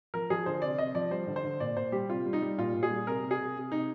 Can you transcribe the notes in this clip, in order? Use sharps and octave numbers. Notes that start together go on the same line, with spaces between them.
F3 A#4
F3 G#4
D3 C5
C3 D5
C3 D#5
F3 D5
G3 C5
D3
C5
D3
A#2 D5
A#2 C5
G3 G4
C3 F4
G3
D#4
G3
A#2 F4
A#2
G#4
G3
C3 A#4
C3
G#4
C3
C3
C3 D#4